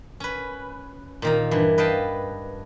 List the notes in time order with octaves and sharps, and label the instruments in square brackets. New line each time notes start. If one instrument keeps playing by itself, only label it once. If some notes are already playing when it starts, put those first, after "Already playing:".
[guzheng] C#4 B4
A#2 D#3 A#5
G2 E3
B4 D#5 F5 G5 A5